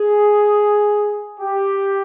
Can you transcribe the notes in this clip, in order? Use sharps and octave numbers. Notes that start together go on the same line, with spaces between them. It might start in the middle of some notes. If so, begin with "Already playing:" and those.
Already playing: G#4
G4